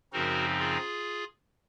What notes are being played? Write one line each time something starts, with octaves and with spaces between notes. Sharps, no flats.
F#2 C#3 F3 C4 D#4 F#4 A#4
F4 G#4